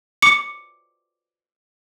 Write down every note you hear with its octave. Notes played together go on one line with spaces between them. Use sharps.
D6 C#7